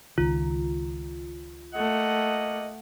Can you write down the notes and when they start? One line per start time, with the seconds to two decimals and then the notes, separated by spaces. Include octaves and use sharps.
0.18 C#2 D#3 F4
1.74 A3 A#3 D#5 F#5